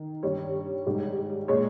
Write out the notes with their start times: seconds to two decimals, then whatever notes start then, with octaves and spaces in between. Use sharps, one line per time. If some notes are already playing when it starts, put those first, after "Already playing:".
Already playing: D#3
0.23 G2 D#3 G3 C#5
0.86 G#2 G3
1.48 A#2 G#3 C#5